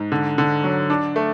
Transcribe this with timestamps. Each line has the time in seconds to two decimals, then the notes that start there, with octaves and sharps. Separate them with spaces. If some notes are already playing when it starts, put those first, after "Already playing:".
Already playing: G#2
0.12 D3
0.38 D3
0.64 F#3
0.90 D4
1.16 A3